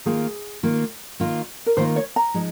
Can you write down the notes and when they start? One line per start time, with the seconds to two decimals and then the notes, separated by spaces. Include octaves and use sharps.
0.06 D#3 A#3 F4 G#4
0.63 D#3 A#3 F4
1.20 D#3 A#3 F4
1.66 A#4
1.77 D#3 A#3 F4 C5
1.96 C#5
2.16 A#5
2.34 F3 G#3 D#4